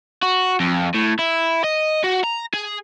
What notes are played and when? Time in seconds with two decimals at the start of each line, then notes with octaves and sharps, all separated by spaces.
0.22 F#4
0.60 F2
0.95 A2
1.19 E4
1.64 D#5
2.04 F#4
2.24 A#5
2.54 G#4